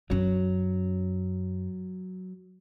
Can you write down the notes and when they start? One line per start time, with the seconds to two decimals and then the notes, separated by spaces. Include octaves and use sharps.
0.10 F#2 F#3 C#4